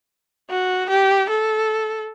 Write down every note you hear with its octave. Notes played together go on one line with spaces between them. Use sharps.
F#4
G4
A4